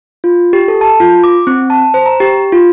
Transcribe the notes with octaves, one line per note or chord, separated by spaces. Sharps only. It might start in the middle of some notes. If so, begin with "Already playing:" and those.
F4
G4
A4
A5
F4
D6
C4
A5
C5
A#5
G4
F4